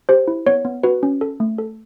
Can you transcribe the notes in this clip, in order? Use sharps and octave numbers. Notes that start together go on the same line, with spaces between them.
G4 C5
E4
B3 C#5
B3
F#4 B4
C#4
A4
A3
A4